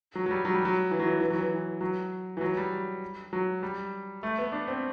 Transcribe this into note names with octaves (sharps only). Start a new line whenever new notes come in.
F#3
F#3
G3
F#3
G3
F#3
E3
F#3
E3
E3
F#3
E3
F#3
E3
F#3
G3
F#3
G3
A3
B3
D4
C4